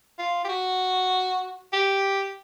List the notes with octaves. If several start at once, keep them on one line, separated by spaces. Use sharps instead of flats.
F4
G4
F#4
G4